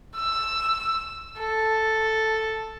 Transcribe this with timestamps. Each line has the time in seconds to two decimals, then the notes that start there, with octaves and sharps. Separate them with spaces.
0.15 E6
1.39 A4